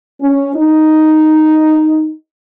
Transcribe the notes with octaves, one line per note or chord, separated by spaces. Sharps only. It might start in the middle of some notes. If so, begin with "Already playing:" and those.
C#4
D#4